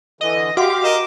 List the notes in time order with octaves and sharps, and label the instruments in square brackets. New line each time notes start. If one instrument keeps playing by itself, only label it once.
[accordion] D3 E3 [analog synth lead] D#5
[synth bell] F#4 F#5 C6 [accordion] G4 F5 [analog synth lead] D6
[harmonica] A#4 D#5 [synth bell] D7 E7